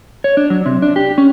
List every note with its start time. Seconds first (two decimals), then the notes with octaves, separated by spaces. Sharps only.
0.24 C#5
0.37 D4
0.50 F#3
0.66 C3
0.82 D4
0.96 G4
1.18 C#4